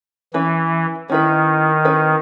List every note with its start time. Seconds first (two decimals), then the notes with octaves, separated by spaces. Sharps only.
0.34 E3 C#4 E4 B4
1.10 D#3 C#4 E4 B4
1.85 C#4 E4 B4